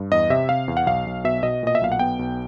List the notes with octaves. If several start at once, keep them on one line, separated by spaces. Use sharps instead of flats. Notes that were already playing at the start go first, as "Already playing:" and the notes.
Already playing: G2
E2 D#5
C3 E5
C3 F5
E2
F#5
B1 F5
B1
B2 E5
B2 D#5
A#2 D#5
E5
B1 F5
F#5
B3 G5
B1